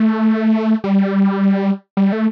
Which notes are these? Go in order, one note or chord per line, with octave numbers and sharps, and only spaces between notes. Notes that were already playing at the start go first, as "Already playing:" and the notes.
Already playing: A3
G3
G3
A3